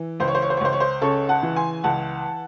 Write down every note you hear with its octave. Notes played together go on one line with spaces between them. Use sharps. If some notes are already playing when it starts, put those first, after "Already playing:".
Already playing: E3
C#2 C5
C#5
C5
C#5
C5
C#5
C#2 C5
C#5
C5
C#3 A4 C#5
F#5 A5
E3
G#5 C6
C#2 F#5 A5